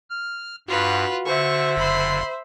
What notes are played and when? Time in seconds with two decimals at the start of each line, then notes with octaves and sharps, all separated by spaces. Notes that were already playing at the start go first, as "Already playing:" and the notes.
0.10 F6
0.68 G2 F4 F#4 B4
1.26 D3 C5 E5 C#6
1.77 F#1 B5 C6